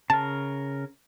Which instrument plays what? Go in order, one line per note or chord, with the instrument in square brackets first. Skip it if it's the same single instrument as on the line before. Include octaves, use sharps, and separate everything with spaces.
[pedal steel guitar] C#3 A#4 [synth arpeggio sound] A5